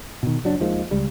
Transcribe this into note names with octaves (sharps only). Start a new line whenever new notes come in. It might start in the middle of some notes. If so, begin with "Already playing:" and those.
B2 D#3
F#1 F#3 D4
D#2 D#3 F3 G#3
C#2 G3